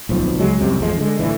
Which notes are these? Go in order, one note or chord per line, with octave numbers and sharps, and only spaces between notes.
D1 B1 F3
C#2 F#3 G#3
C2 F#2 C3
G#1 E2 F3 G#3
D3 G#3
A2 D3 E3